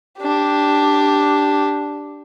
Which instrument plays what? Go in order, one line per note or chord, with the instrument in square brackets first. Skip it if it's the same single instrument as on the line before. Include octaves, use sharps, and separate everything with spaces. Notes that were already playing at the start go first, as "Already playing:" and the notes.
[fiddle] D4 G4